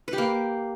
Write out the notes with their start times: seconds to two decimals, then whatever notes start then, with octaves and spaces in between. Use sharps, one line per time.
0.08 B4
0.13 G4
0.18 A#3